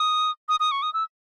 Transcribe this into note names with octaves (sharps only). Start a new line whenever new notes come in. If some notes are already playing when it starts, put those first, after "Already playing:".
Already playing: D#6
D#6
D#6
C#6
D#6
E6